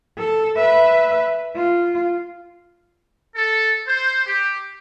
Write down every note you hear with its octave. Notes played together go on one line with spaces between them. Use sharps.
A4
B4 E5
F4
A4
C5
G4